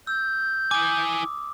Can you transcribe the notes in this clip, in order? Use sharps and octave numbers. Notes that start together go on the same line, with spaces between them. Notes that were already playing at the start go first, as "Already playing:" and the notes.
E6 G6
E4 G#5 D6 D#6